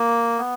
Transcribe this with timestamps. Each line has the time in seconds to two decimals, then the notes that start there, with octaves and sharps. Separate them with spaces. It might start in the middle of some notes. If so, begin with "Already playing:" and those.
Already playing: A#3
0.38 B3